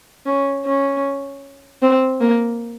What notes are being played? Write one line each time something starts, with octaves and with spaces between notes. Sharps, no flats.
C#4
C#4
C4
A#3